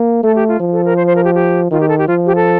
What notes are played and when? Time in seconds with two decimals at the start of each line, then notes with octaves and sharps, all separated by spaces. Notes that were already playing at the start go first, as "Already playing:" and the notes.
Already playing: A#3
0.23 A3 A4
0.35 G4
0.48 F4
0.60 F3
0.73 A4
0.85 A#4
0.97 C5
1.07 C5
1.16 A#4
1.24 G4
1.34 G4
1.71 D#3 F4
1.80 G4
1.89 A4
1.98 G4
2.08 F3 F4
2.26 G4
2.35 A4